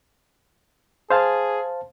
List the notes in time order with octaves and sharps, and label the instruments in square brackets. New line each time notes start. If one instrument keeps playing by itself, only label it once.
[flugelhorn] G#4 [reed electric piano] C5 F5 A5